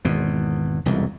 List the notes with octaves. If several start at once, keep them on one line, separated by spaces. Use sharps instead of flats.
G#1 E2 B2
E1 C2 F2